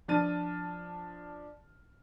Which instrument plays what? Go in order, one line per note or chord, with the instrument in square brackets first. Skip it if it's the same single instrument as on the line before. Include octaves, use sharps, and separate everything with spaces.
[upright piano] F3 D4 A5 F6 A6 D#7